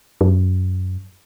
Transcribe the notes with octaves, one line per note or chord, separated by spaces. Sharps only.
F#2